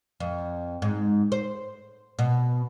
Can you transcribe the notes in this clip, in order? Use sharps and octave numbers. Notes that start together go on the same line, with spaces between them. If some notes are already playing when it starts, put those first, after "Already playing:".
F2
G#2
C5
B2